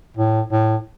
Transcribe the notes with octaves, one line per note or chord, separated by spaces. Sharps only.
A2
A2